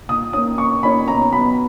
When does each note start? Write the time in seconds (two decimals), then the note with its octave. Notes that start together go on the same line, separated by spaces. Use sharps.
0.09 A#2 D#6
0.33 A#3 C#4 D#6
0.58 A#2 C#6
0.83 A#3 C#4 B5
1.08 B2 A#5
1.33 F#3 B3 B5